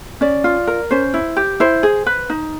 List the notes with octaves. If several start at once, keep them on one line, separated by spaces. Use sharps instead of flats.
C#4 D5
F4
A#4
C#4 C5
E4
G4
E4 C5
G#4
B4
D#4